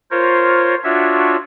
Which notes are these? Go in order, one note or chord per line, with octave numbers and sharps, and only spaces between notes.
F4 A#4 C5 C#5
D4 F4 F#4 C#5 E5